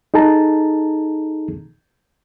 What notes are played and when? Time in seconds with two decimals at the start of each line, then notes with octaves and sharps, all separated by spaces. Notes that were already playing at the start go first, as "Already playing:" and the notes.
0.14 D#4 G#4 A4 A5 A#5